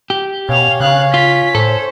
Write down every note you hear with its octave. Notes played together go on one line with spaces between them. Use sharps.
G4
B2 C#4 C#5 F5 F7
C#3 F5 F#6
F4 B6
A2 A4 C5